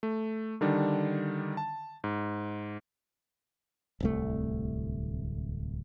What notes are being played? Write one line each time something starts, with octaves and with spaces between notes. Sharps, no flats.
A3
D3 D#3 G3 D4
A5
G#2
D1 C2 A3